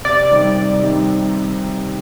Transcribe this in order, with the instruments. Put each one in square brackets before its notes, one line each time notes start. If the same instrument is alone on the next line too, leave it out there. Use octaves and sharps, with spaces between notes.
[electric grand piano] C3 [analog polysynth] D5
[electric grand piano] D#3 G3 C4 D#4
C3
D#3 G3 C4 D#4